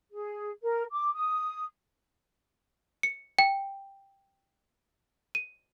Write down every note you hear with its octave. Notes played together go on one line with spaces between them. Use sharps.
G#4
A#4
D6
D#6
C#7
G5
D#7